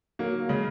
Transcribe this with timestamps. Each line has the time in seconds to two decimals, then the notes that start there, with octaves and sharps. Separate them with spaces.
0.19 F#3 A#3
0.49 C#3 G#3